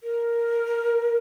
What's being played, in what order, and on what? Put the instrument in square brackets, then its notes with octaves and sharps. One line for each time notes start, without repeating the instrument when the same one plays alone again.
[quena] A#4